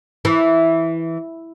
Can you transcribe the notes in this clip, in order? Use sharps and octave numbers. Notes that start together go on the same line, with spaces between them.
E3